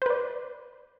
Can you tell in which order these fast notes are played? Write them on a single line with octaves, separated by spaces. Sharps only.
C5 B4 D5